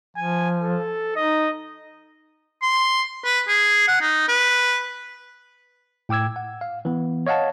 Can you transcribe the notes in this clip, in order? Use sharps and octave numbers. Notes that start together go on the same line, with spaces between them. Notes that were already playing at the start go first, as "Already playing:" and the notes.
F3 G#5
A4
D#4 D#5
C6
B4
G#4
F#5
D#4
B4
A2 G5 D6 E6 G#6
F#5
F5
E3 B3
C#5 D#5 F5 F#5 A5